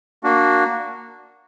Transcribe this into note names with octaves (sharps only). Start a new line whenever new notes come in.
A#3 D4 F#4